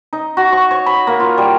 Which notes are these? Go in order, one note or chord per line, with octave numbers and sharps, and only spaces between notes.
D#4
F#4
C#6
C#5
B5
A#3
F4
G3